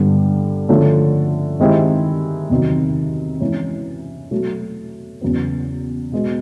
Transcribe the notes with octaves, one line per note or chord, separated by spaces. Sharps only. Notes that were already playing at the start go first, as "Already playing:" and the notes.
Already playing: G2 D3 G3 B3
D3 F3 A3 C#4
D#3 G#3 C4 E4 G4
E2 C3 D#3 F#3
E3 G#3 C#4
B2 F#3 A3
E2 C#3 F#3 B3
B2 G#3 B3